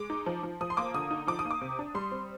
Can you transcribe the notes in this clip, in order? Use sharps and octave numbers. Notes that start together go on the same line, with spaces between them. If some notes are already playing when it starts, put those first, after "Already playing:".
Already playing: G#3 D6
D#4
F3
F3
F3 D#6
C6
A#3 D6
D3 D#6
D#4
F3 D6
D#6
A#3
D6
C3
D4
G3 C6
C4